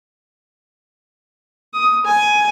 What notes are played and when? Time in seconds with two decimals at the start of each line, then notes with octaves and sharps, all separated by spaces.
1.73 D#6
2.05 G#5